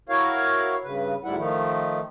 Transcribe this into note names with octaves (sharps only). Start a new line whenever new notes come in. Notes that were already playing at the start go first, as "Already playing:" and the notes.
E4 F#4 A#4 C#5 F5
G2 C#3 B4
D2 G#2 G3 E4 F#5
D#3 F3 A3